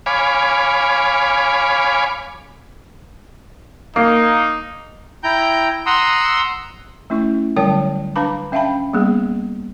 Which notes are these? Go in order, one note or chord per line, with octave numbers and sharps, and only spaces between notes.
C#5 F5 G#5 B5 D6
A#3 D#4
E4 G5 A#5 G6
F#5 A#5 C6 D#6 E6
A3 C#4 E4 C#6
D3 F#3 G3 C#5 G5 A5
D4 B4 F5 A5 B5 D6
C#4 E5 F5 G5 A5 B5
G3 A#3 B3 G#4